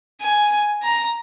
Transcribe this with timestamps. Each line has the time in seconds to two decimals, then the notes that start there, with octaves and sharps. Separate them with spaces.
0.21 G#5
0.83 A#5